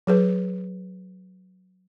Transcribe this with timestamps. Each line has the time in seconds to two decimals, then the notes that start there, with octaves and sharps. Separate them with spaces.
0.07 F#3 G#4 B4